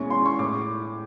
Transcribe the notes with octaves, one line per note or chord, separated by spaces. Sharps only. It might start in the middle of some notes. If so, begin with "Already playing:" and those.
Already playing: E2 B2 G#3 C#4 E4 C#6
C6
C#6
A2 D6